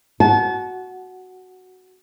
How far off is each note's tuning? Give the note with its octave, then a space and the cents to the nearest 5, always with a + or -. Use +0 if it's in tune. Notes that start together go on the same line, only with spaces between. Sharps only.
F#4 +0 A5 -35